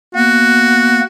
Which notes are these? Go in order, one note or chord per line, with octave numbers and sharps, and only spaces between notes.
A#3 B3 F#4